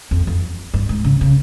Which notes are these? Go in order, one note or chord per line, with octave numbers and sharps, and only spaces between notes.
F2
F2
G2
G#2
C#3
C#3